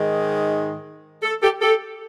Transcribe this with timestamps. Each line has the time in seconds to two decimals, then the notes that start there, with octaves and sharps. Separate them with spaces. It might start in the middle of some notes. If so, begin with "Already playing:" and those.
Already playing: G#2 D#3 G#3
1.23 A4
1.43 G4 A4
1.61 G4 A4